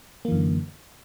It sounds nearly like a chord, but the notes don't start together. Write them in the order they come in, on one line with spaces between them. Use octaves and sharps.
A#3 E3 F#2 D3